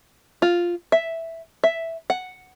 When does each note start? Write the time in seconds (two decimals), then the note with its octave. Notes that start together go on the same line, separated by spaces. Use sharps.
0.42 F4
0.92 E5
1.64 E5
2.10 F#5